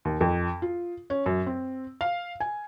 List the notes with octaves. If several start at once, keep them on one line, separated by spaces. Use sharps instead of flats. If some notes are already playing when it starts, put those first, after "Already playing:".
D#2
F2
F4
C#4
F#2
C4
F5
G#5